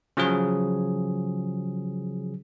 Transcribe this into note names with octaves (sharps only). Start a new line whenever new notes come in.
C#3 F3 F#3 G#4